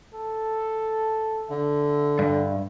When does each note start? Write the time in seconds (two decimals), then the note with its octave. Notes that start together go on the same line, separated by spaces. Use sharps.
0.14 A4
1.50 D3 E5
2.19 G2